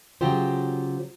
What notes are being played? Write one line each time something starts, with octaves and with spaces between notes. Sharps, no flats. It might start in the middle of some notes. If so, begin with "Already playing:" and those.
C#3 F#3 F4 G4 C5